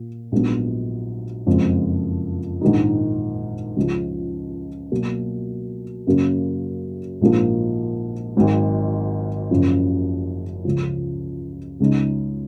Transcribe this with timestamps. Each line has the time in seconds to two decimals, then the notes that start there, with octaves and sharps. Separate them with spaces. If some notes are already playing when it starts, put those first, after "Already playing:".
Already playing: A#2
0.32 A#1 G#2 F#3 B3
1.46 F#1 F2 F3 G#3
2.61 A#1 G#2 D#3 G#3 D#4
3.77 C#2 C#3 F3
4.92 B2 F#3 A#3
6.07 F#2 C#3 F#3 A#3
7.21 A#1 G#2 F3 A#3
8.36 G#1 G#2 F#3
9.51 F#1 F#2 C#3 F3
10.65 C#2 C#3 F3
11.80 C#2 C#3 G#3 D#4